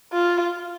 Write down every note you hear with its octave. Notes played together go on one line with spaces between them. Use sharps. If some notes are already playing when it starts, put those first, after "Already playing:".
F4